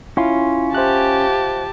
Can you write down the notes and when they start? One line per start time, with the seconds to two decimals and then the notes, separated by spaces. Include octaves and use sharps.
0.17 C#4 E4 F4 C6
0.75 G4 C5 E5 A5 F#6